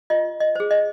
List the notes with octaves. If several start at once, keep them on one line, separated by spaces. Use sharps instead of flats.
F4 D#5
D#5
G#4 C5
D#5